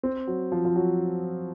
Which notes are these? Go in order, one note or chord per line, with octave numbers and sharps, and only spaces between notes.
C4
F#3
F3
F3
F#3